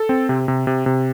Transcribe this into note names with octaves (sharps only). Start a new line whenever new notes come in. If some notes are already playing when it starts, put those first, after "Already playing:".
Already playing: A4
C4
C3
C3
C3
C3